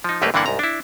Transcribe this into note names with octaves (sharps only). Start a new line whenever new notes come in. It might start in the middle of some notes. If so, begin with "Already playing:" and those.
F3 D#4
C2 F#2 A3 A#3 G4 B4
G2 D3 E3 A#3 D4 F#5
C2 G#2 A#5
D4 E4